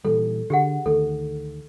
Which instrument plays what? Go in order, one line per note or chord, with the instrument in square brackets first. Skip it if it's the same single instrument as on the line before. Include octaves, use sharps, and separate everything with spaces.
[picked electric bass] A#2 E3 G3 [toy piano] A4
[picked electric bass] D3 [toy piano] G4 G#4 F#5
[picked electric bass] D2 D#3 A3 [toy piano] A4